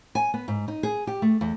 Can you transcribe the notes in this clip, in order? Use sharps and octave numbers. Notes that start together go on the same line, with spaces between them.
G#5
B3
G#2
D#4
G#4
G4
A3
E2